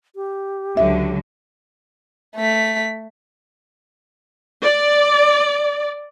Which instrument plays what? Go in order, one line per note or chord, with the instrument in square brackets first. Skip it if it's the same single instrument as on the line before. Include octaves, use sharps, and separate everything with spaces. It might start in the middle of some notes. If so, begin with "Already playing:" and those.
[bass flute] G4
[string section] C#2 D3 F#3 [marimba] E5
[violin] A3 B6
[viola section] D5